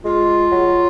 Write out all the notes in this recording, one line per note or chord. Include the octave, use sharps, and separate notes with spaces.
G#3 F4
F#3